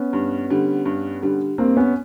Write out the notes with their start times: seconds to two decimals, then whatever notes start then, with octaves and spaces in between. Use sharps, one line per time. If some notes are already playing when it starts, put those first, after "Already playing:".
Already playing: B3 C#4
0.13 G2
0.50 D3 G3
0.86 G2
1.23 D3 G3
1.58 G2 A#3 C4
1.76 B3 C#4